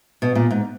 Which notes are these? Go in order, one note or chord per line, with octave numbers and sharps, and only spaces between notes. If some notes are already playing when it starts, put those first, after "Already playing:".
B2
A#2
G#2